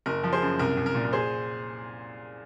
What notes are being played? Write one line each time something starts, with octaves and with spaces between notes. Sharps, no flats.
F#1 A#4
F3
G#4 C5
F#2
C2 A#4
C2
A#4
A#2
A#4
G#4 C5